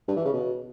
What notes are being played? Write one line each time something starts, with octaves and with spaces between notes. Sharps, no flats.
G2
E3
C#3
B2